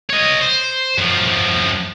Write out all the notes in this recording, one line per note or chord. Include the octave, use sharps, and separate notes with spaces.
C#5 D#5
C5
F#2 F3